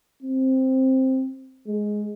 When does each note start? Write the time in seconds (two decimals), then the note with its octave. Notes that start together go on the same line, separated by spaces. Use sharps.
0.23 C4
1.67 G#3